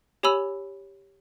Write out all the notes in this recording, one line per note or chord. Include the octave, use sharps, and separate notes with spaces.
G4 C#5 G#5 B5 E6 F7